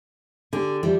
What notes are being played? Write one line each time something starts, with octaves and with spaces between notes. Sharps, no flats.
D3 G4 G#4
E3 F3 G3